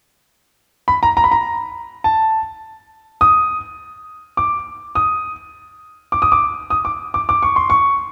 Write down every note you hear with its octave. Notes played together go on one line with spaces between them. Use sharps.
B5
A#5
A#5
B5
A#5
A5
D#6
D6
D#6
D6
D#6
D6
D#6
D6
D6
D6
C#6
C6
C#6